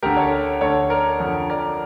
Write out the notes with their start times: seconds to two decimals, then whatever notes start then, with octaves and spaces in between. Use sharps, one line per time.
0.03 D2 D3 G4 A#4
0.17 A4 C#5
0.61 D2 D3 A4 C#5
0.90 A#4 D5
1.20 F2 D3
1.50 A#4 D5